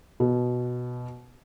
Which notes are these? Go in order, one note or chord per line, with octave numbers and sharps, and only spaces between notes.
B2